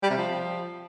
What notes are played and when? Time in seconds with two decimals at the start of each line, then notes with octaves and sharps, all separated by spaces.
0.03 G3
0.10 C3
0.17 F3